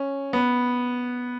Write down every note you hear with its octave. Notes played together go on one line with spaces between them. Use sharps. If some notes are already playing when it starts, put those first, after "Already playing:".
Already playing: C#4
B3